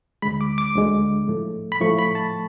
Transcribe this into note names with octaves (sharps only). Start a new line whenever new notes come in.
D2 D3 G#3 B5
D6
D6
D2 D3 G#3
A2 F3 A3
B5
A2 F3 A3 C#6
B5
A5